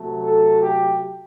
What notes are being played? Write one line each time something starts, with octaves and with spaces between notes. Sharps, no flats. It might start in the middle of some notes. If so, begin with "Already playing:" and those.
Already playing: C3 F#3 A3
A4
G4